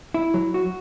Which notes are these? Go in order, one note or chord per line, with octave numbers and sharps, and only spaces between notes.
E4
F#3
F#4